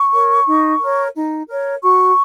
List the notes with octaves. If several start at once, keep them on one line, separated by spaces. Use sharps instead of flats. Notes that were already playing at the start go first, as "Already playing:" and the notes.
Already playing: C#6
A#4 C#5
D#4
A#4 C#5
D#4
A#4 C#5
F#4 C#6